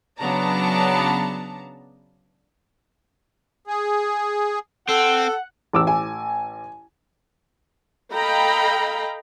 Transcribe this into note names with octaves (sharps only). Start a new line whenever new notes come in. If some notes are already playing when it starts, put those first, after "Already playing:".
C#3 F#3 B3 D4 A5 A#5
G#4
C4 A4 F#5
A1 D6 E6
G#5
A4 D#5 F5 G5 A#5 B5